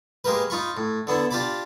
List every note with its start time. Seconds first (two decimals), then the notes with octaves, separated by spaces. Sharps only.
0.24 G#3 A#3 G4 A#4 B4
0.50 D#4 F4 B5 C#6
0.77 A2
1.07 D3 B3 D4 E4
1.31 D4 F4 G4 D5 B5 D6